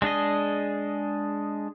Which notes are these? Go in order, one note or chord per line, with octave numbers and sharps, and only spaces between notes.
G#3 D4 G#4 D#5